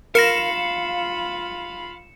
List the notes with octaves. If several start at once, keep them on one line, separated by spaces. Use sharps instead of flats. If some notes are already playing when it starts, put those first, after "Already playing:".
F4 A#4 F5 B5 A#6 C#7 E7